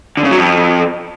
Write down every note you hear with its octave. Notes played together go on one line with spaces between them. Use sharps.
D3
C#3
F#3
F2